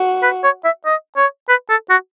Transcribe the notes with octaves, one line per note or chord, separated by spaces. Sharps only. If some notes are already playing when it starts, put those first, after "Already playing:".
Already playing: F#4
B4
C#5
E5
D#5
C#5
B4
A4
F#4